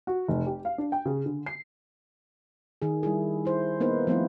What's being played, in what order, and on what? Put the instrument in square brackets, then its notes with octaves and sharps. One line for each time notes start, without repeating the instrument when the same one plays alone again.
[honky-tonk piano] F#4
F1
G4
F5
D4
G5
C#3
D3
C7
[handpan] D#3 G#4
G3 E4 G#4
E4 C5
A#3 B3 D#4 B4 C5
F3 A3 B3 C4 E4 F4